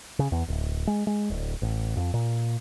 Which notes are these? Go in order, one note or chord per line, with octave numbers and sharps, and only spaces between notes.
C#3
E2
D1
G#3
G#3
D1
A1
F2
A#2